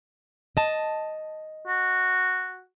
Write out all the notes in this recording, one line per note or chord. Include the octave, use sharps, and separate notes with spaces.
D#5 A5
F#4